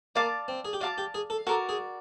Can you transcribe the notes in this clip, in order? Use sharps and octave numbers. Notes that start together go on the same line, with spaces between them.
A#3 D5 F5 A5 D6
C4
G#4
G4
F#4 D5 F5 A5 D6
G4
G#4
A4
F#4 A4 A#4 D5
G#4